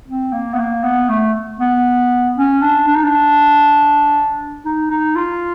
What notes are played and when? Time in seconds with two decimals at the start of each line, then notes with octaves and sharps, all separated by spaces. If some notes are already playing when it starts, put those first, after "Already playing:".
0.08 C4
0.33 A#3
0.54 B3
0.59 A#3
0.84 B3
1.09 A3
1.60 B3
2.37 C#4
2.62 D4
2.87 D4
2.96 D#4
3.04 D4
4.65 D#4
4.90 D#4
5.16 F4